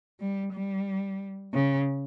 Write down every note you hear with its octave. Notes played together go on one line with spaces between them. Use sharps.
G3
G3
C#3